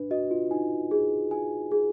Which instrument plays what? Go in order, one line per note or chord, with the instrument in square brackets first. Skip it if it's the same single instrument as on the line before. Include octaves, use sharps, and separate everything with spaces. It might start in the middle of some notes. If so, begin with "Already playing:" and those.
Already playing: [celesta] D4 [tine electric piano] B4
[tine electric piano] F#4 [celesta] D#5
[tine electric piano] F4
[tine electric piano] D#4 [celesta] G#5
[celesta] G#4
G#5
G#4